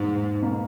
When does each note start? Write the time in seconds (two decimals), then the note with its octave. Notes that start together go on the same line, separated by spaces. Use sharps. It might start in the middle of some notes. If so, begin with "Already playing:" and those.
Already playing: E2 G#2 B2 A#3
0.42 B2 A#3